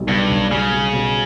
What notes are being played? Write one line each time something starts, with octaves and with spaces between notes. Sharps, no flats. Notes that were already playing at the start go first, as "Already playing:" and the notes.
Already playing: B1 G3
G2 B2
B1
C#3 G3
G3
B2